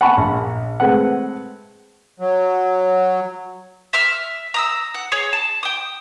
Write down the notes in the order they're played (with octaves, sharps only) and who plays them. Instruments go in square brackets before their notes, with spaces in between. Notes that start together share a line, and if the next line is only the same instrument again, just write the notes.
[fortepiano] F#5 G#5 A5 B5 C#6
A#1
G#3 A3 C4 B4 F#5
[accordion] F#3
[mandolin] E5 E6 F6
A#5 D#6 E6
F#5
G#4 C#5
A5
G5 D#6